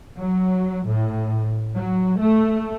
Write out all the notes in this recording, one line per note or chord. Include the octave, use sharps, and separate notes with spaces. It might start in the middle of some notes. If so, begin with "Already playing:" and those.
F#3
A2
F#3
A3